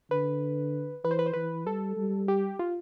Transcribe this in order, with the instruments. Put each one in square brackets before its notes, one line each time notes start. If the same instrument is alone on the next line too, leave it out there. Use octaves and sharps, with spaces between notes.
[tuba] D3 [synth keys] B4
[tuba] E3 [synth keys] B4
[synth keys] C5
B4
C5
[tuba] E3 [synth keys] B4
[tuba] G3 [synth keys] A4
[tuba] G3
[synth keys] G4
F4